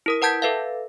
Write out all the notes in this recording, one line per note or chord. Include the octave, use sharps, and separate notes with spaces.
E4 A#4 D#6
B4 F#5 A5 G6 G#6 B6
A4 B4 E5 F5